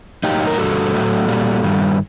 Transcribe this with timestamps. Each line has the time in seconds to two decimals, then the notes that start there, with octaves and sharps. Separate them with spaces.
0.24 A2 F#3 D#4 G4
0.47 A#4
0.58 G2 D3 G3 F#4 A4
0.93 A2 F#3
1.28 A#2 G3
1.63 G2 D#3 G3